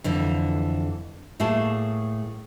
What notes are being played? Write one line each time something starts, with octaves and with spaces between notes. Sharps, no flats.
F2 D3 E3
A2 A3 A#3 G#4 A5